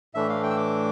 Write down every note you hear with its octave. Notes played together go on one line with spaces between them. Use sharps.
A2 E3 A3 D4 E5
F5
G5
E6
D6